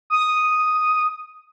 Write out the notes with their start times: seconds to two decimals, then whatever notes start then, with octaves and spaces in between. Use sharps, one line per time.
0.10 D#6